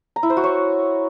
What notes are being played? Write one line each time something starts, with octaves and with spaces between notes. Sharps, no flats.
A#5
E4
C5
F#4
C#5